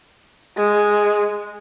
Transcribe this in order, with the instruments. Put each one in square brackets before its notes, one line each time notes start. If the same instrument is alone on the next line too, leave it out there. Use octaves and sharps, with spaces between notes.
[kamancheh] G#3